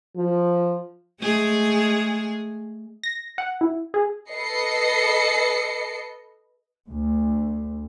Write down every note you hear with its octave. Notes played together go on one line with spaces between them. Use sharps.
F3
G#3 A3 G#4
A#6
F#5
E4
G#4
A4 B4 D#5 C7 C#7
D2